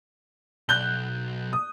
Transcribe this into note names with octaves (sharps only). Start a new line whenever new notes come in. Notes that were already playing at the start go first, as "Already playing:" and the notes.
B1 F#6 G6 G7
D#6